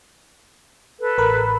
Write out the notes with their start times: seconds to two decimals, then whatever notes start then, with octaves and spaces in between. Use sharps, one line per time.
1.00 A4 B4
1.18 A1 A#4 B5